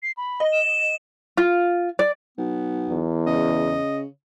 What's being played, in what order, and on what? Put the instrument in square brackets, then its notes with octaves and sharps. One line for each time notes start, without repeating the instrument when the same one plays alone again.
[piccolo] C7
B5
[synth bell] D#5
[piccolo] E7
[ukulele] F4
D5
[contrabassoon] B1 [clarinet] B3
[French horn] E2
[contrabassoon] C#3 [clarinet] D#5